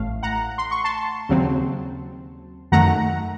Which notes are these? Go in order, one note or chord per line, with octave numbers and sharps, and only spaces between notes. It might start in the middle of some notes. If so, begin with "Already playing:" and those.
Already playing: A1 A2 A3 F5
F#5 A#5
C6
C#6
A5 C6
D#2 C#3 F#3 C4
F#2 D#3 A3 F#5 A#5